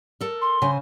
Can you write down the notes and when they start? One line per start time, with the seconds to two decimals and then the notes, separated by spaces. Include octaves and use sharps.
0.21 A4 A#4
0.41 C6
0.62 C#3 C5 G#5